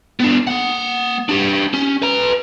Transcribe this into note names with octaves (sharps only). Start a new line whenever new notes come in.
B3 D4
A#3 F#5
D4 G4
C#4
B4 A#5